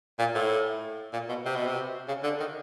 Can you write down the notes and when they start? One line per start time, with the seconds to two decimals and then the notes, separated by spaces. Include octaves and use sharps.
0.19 A#2
0.35 A2
1.13 A#2
1.29 B2
1.45 C3
1.56 B2
1.67 C3
2.08 C#3
2.24 D3
2.40 D#3